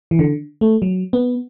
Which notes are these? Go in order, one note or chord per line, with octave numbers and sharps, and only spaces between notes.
E3
D3
A3
F#3
B3